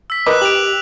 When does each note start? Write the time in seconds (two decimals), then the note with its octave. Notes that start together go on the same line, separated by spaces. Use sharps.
0.10 E6 B6
0.26 A#4 B4 D#5 D6 F#6
0.42 G4 D7 F7 F#7